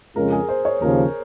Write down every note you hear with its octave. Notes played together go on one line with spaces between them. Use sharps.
F2 C#3 G#3 C#4 F4 A#4
G#4
C5
C#5
D#2 C#3 F3 A#4